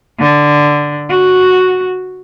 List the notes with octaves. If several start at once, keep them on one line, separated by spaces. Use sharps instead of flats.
D3
F#4